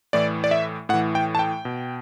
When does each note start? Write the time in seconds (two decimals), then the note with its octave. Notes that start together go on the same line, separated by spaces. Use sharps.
0.13 A2 E3 D5
0.44 D5
0.51 E5
0.89 A2 F#5
0.94 E3
1.15 G5
1.35 A5
1.39 G5
1.65 B2